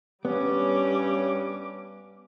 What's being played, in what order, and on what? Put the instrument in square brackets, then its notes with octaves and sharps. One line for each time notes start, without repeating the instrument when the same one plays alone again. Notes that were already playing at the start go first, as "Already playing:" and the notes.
[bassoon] G2 [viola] G3 D6 [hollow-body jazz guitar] B3 [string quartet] C#4 C#5